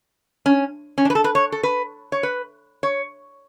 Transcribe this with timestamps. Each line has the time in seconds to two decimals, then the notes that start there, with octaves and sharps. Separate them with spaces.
0.46 C#4
0.98 C#4
1.05 D4
1.10 B4
1.15 A4
1.24 B4
1.35 C#5
1.52 A4
1.63 B4
2.12 C#5
2.23 B4
2.83 C#5